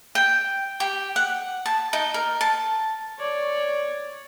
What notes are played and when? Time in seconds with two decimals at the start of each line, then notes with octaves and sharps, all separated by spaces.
0.15 G5
0.80 G4
1.16 F#5
1.66 A5
1.93 D#4
2.14 A#4
2.41 A5
3.19 C#5 D5